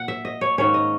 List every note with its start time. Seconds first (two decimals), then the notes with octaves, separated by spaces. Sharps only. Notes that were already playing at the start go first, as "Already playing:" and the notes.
Already playing: A#2 A#3 F#5
0.08 E5
0.25 D#5
0.41 C#5
0.58 G#2 D#3 A#3 C#4 C#5
0.74 D#5